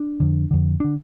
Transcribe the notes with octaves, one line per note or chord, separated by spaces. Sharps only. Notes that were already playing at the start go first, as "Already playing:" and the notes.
Already playing: D4
F2 D3
F2 D3
D3 D4